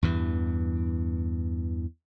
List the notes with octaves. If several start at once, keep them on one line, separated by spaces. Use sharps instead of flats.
E2 G2 E3